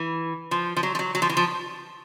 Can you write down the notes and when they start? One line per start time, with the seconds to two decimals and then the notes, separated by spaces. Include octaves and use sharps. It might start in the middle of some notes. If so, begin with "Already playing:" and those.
Already playing: E3
0.51 F3
0.77 F3
0.83 F#3
0.95 F3
0.99 F#3
1.15 F#3
1.22 F3
1.29 E3
1.37 F3